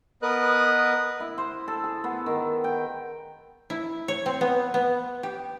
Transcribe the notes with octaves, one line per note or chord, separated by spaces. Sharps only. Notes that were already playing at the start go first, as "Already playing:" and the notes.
B3 A#4 B4 D#5 D#6 F#6
E4
C5
A4
G#4
B3
D#3
G5
E4
C#5
C4
B3
B3
G4